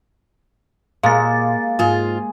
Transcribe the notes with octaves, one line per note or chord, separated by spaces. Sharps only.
A#2 G#3 A#3 F5 A6
G#2 F4 G#4